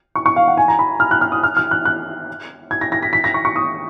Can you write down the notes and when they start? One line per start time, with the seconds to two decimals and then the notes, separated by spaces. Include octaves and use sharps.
0.16 C#6
0.26 C#6
0.36 F5
0.48 F#5
0.57 G#5
0.68 A#5
0.79 B5
1.00 F6
1.11 F#6
1.21 F6
1.32 D#6
1.43 F6
1.57 F6
1.71 F#6
1.85 F#6
2.71 G#6
2.81 A#6
2.92 A#6
3.03 B6
3.13 B6
3.24 A#6
3.34 C#6
3.45 C#6
3.56 D#6